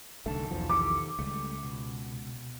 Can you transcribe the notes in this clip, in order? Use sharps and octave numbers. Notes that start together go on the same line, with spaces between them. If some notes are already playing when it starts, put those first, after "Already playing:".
C2 F#2 D3 D#3 A3 A5
B1 E2 F3
D#3 G4 A4 D6
C#2 G3 A3
B2